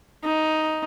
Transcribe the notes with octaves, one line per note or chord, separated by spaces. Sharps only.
D#4